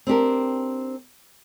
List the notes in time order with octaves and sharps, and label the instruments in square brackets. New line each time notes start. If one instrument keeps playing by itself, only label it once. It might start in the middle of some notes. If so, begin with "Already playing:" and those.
[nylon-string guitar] C4 D4 G4 A#4